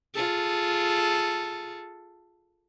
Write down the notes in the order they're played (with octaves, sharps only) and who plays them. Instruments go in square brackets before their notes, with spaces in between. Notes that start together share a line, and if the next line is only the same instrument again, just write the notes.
[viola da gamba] F4 G#4 A4